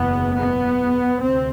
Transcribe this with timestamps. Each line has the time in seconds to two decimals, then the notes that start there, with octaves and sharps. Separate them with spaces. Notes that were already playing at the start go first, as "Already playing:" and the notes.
Already playing: F#1 E2 B2 B3
0.35 B3
1.21 D2 C3 C4